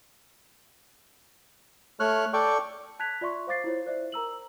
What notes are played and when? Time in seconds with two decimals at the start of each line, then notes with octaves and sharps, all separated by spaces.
2.00 A3 C#5 F6 F#6
2.33 A4 D5 G5 C#6
2.99 A5 F#6 G#6 B6 F7
3.21 F4 D5 E5 C6 C#6
3.47 C5 F5 D6 A6 C7
3.64 E4 F4 C5 C#5
3.87 C5 D5 E5
4.12 A#4 A#5 E6 F#7